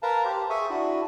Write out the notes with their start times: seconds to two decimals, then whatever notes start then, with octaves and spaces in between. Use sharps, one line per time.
0.03 A#4 B4 F5 A5 A#5
0.25 G4 C5
0.50 G#4 E5 G#5 C#6
0.70 D4 E4 F#4